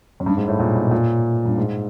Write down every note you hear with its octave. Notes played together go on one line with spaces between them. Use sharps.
F#2
G2
G#2
A2
A#2
B2
A#2
G2
G#2